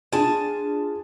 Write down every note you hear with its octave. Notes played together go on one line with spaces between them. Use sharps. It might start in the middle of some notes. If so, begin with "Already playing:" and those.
D4 F4 G#4 A5